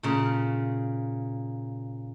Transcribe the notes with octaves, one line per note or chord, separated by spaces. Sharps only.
A#2 C#3